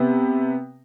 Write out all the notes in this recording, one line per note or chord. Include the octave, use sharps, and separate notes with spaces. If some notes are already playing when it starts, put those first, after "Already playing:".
Already playing: C3 B3